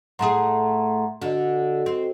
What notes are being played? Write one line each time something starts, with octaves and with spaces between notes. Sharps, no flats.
A2 A3 G#4 F#5 A#5 C6
D3 F#4 D#5
C4